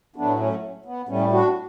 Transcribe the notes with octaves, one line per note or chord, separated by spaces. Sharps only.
A2 F#3 A3 B3 D4
A3 C#4
B3
A2 G3 A3 C#4
D4 F#4